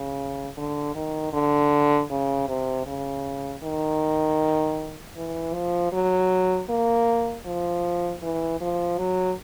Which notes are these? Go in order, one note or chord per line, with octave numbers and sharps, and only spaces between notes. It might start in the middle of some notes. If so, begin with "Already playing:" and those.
Already playing: C#3
D3
D#3
D3
C#3
C3
C#3
D#3
E3
F3
F#3
A#3
F3
E3
F3
F#3